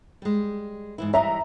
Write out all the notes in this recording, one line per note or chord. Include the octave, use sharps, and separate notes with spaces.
G3 G#3
G#2 E3 E4
E3 G3 D#5 E5 A#5